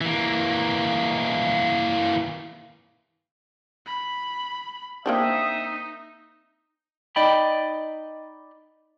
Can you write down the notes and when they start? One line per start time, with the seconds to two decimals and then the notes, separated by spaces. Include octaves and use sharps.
0.01 E3 A#3
3.86 B5
5.06 A#3 C4 D4 D#4 E5 D#6
7.16 D#4 D5 D#5 G5 B5